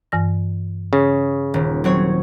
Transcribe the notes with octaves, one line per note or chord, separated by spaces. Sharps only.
G2 E3 A#6
C#3
D#1
F#3 C4 C#5